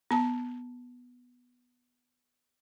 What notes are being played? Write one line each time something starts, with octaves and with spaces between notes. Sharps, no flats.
B3 A5